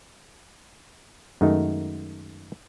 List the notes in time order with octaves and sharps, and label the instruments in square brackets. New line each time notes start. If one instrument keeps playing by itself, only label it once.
[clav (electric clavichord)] F#2 D#3 G#3 A3 D#4